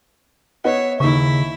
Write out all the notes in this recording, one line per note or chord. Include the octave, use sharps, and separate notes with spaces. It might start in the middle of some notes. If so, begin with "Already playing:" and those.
B3 C#5 D#5 E5 F#5
D#2 C#3 E4 E5 C#6